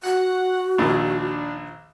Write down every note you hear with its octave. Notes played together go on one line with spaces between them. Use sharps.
F#4 F#5
A#1 D#2 A#2 D4